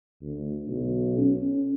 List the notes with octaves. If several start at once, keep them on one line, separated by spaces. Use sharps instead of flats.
D2
B1
C#4